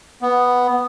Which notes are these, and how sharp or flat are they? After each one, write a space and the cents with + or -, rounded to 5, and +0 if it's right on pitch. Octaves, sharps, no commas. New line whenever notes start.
B3 +0